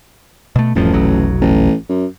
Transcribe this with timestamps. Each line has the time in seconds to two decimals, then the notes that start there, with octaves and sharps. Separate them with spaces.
0.56 B2 A3
0.75 D#1 A1 G2 F3
0.93 F1 B1 F#3
1.41 A1
1.89 F#2